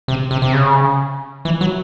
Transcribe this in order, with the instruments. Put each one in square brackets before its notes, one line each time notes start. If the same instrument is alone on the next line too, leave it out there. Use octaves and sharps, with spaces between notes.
[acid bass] C3
C3
C3
C#3
E3
F#3